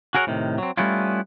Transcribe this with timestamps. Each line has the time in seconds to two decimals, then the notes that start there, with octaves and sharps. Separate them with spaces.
0.15 F#4 G#4 A#4 C#5 F#5
0.27 A2 C3 D#3
0.58 F#3 C4
0.77 G3 A3 B3 C#4 E4 F4